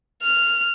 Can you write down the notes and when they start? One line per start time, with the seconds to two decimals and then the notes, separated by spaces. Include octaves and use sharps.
0.23 F6